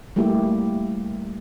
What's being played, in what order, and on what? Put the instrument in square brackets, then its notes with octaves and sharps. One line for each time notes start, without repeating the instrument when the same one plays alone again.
[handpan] G3 A3 A#3 E4 G4